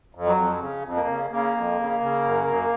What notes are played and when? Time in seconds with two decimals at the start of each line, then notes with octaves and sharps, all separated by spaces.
0.15 F2
0.26 F#3
0.37 F2
0.60 C#3
0.84 F2
0.96 A#3
1.07 C#3
1.31 C#3 A#3
1.54 F2
1.77 C#3
2.01 C#3
2.24 F#2
2.47 F#2